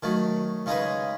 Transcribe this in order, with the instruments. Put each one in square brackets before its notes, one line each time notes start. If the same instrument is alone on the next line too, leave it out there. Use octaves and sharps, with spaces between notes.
[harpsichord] D#3 F#3 A3
C#3 G#3 D#4 G#4 B4